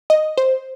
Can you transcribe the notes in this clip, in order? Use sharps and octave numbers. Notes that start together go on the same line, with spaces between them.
D#5
C5